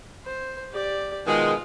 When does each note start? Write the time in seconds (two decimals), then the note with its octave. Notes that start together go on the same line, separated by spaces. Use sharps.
0.25 C5
0.72 G4 D5
1.26 B2 D#3 G#3 F4